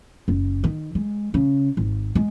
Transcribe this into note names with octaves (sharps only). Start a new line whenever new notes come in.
F#1
D#3
G#3
C#3
G#1
G#3